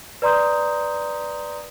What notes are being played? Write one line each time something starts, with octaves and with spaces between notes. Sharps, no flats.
B4 D5 A#5 C6 D#6 G6